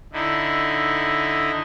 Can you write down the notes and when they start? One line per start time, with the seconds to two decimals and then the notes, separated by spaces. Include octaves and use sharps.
0.13 D3 D#4 E4